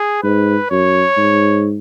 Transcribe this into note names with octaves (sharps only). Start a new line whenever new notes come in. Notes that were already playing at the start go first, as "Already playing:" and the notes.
Already playing: G#4
G#2 B4
F#2 C#5
G#2